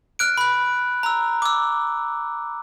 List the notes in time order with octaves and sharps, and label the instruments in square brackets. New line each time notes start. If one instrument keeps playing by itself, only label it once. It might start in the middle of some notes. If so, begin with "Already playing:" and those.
[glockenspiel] F6 F#6 D7
B5 F#6
A#5 E6
D6 E6